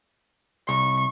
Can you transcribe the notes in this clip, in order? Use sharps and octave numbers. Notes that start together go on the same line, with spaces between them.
C2 C#6